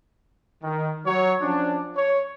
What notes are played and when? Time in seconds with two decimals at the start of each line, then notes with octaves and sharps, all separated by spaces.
0.62 D#3
1.06 F#3 C#5
1.41 F3 C#4 D4
1.95 C#5